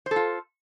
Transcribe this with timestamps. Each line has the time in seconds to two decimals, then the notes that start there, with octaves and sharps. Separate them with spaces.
0.06 C5
0.11 A4
0.16 F4